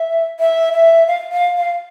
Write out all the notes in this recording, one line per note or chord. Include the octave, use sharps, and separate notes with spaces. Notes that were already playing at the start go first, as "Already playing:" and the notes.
Already playing: E5
E5
E5
F5
F5
F5